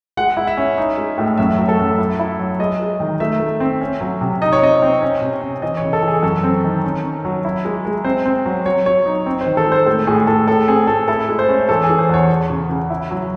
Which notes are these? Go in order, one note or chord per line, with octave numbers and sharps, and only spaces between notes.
G#3 F#5
E4
E5
C#4
D#4
G#3
A2
F#2 E5
F#3
A4
F#2
E4
E4
F#3
G#3 D#5
G#3
D#3
A3 E5
A3
C4
C#4
F#3
C3
D#4 D#5
C#5
C4 D#5
C4
C#4
C3
C#4
E3 D#5
C#5
C#3
A4
E3
G#4
F#2 A4
C4
D#3
C#4
C#4
F#3
E4
G#3
G#3
C4 C5
C4
F#3
F#3 C#5
F#3 C#5
D#4
C4
C5
D#3
A4
G#3
C5
A2 A4
A2 G#4
A2 A4
A2 A4
C4 G#4
A2 A4
E4 A4
G#3
C5
C#4
E3 A4
G#4
E3
C5
E2 C#5
E2
C#3
C#3
E4
F#3